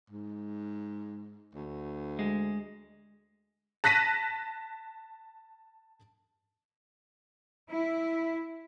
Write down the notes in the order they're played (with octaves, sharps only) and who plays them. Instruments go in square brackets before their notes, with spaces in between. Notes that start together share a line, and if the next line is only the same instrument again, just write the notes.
[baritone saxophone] G#2
D2
[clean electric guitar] G#3
[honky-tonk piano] A5 F#6 A#6 B6 D#7
[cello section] E4